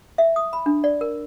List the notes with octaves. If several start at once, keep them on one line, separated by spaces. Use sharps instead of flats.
E5
D#6
B5
D4
D5
A#4